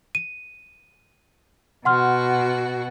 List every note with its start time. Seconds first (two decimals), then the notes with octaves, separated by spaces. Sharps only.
0.15 D#7
1.85 B2 F#4 F#5 C6 F6